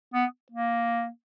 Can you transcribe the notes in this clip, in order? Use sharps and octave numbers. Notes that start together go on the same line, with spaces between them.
B3
A#3